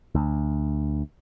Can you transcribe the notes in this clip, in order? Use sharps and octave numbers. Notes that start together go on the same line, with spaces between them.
D2